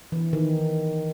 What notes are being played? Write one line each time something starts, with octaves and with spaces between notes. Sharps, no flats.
E3
D#3